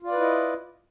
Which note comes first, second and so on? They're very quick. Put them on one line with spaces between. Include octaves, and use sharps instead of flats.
F4 D5 B4 E4 D#5